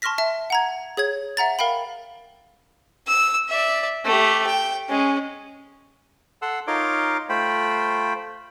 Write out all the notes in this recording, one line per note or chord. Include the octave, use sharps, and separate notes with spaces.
A5 C6 C#6 F6 A#6 B6
E5 A5
F#5 A#5 G#6
G#4 C#5 G#6
E5 F#5 A#5 A6
A#4 F5 G5 B5
E6
D5 E5
A3 G4
G5
G#3 C#4
A4 F#5 C6 E6
D#4 F4 A#4 C#5 C6 D6
A3 F4 C5 G5 B5